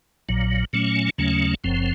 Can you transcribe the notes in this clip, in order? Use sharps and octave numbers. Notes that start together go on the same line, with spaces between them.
A#1 A#2 F#3
A#2 F#3 A3 C#4
D#2 C#3 F#3 A3 C#4
F#1 F#2 F3 C4